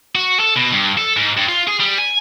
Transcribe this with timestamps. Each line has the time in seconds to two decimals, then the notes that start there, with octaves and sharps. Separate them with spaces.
0.15 F#4
0.40 A4
0.56 B2
0.72 G2
0.97 A4
1.17 G#2
1.37 G2
1.48 F4
1.67 G#4
1.80 G3
1.98 G#5